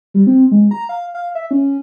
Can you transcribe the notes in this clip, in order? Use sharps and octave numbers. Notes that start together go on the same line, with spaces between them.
G3
C4
G#3
A#5
F5
F5
E5
C#4